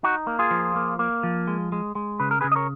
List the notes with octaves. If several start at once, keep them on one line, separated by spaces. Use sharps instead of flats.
D#4 F#4
A#3
F4 G#4
F3
A#3
A#3
F3
G#3
G#3
G#3
C#3 B4
A#4
C#3 G#4 B4
D#5
A#4 C#5